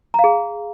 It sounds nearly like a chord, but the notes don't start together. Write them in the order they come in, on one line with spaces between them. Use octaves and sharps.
A#5 F5 G#4